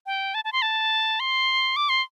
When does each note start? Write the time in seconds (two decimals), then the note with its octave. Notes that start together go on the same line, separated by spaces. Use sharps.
0.06 G5
0.34 A5
0.45 A5
0.52 C6
0.62 A5
1.20 C6
1.76 D6
1.89 C6